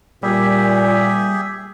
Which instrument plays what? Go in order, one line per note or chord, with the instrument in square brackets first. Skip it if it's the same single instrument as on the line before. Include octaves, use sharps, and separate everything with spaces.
[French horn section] A#2 [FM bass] G3 [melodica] G4 G#4 E5